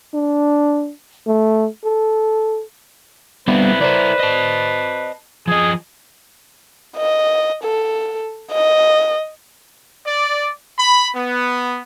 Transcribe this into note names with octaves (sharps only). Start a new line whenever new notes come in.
D4
A3
A4
G3 B3 C4 E4 B4
E4 A#4 C5 D5
D#5 A5
F3 G#4 D#5
D#5
A4
D#5
D5
B5
B3